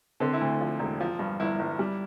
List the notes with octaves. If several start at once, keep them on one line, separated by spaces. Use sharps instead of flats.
D3 C4
E4
D2
F3
E1
F3
G2
G1 E4
G1
G3